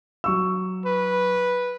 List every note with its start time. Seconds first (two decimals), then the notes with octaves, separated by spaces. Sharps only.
0.24 F#3 C#6 E6
0.86 B4